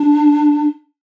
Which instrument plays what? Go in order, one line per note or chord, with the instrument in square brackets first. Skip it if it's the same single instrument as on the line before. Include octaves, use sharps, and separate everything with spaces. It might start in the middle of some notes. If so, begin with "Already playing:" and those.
Already playing: [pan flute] D4